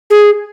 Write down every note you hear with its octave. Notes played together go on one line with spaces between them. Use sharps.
G#4